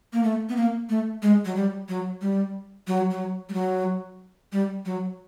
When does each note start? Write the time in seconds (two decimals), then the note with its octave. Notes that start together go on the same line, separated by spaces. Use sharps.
0.13 A#3
0.23 A3
0.49 B3
0.56 A#3
0.89 A3
1.22 G#3
1.45 F#3
1.55 G3
1.88 F#3
2.21 G3
2.87 F#3
3.11 F#3
3.49 G3
3.53 F#3
4.52 G3
4.85 F#3